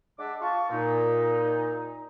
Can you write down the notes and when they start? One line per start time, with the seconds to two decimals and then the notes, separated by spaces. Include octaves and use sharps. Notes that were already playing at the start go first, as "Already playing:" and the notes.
0.18 G#3 D4 E5 F#5 A5 D6
0.41 F4 A5 C#6
0.70 A#2 D#4